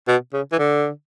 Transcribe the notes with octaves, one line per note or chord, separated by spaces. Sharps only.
B2
C#3
E3
D3